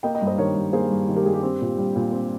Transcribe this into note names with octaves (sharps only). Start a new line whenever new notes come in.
A#3 D#5 G5
D#5 G5
G2
C5 D#5
D#3 A#4 C#5
G2
A#3 G#4 C5
G2
D#3
G4 A#4
G2 G#4
G4
C4
A#2
G3
A#2
C4